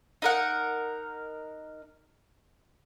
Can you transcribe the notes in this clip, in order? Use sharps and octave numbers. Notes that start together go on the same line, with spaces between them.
D#4 A#4 F#5